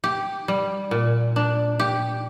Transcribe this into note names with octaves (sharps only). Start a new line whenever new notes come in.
G4
G3
A#2
D4
G4